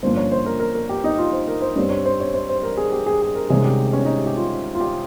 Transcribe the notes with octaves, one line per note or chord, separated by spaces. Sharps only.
G1 G2 F3 A#3 C#4 C5
C#5
C5
A#4
A#4
A#4
G4
D#4
F4
C5
A#4
C5
G2 G3 C4 C#5
C#5
C5
C#5
C5
C5
A#4
G#4
G4
G#4
G#4
A#4
C2 C3 D#3 G#3 C#4 G#4
G4
C#4
D#4
G4
G4
F4
F4
G4